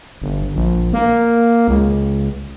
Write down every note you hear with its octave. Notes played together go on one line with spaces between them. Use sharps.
G1
A#1
A#3
C#2